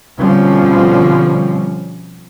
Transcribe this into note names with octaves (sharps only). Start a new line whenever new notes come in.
B2 D3 F3 G3 C4 C#4